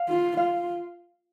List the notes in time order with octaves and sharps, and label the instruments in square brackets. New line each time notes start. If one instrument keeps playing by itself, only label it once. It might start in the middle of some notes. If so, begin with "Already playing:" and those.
Already playing: [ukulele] F5
[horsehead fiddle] F4
[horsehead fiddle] F4 [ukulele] F5